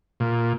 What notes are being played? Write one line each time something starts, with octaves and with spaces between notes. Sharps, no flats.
A#2